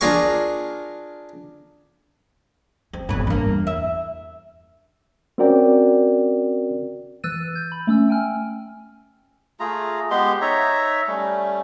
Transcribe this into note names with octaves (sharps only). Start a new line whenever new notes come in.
D4 F4 G#4 A#4 G#5 C#6
C4
G#1 E3 B3 B4
E2 G2 A#3
E5
C4 C#4 F#4 A#4 D5 G5
E3 E6 F#6 A6 D#7
G6
B5
A3 C#4 E6
G5 G#5 F6
A3 F4 G#4 A#5
G#3 B3 G4 C6
D#4 C#5 E5 A#5
G3 A3 C#4